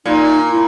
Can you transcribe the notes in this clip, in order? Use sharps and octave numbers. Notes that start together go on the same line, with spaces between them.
A#2 D#4
E4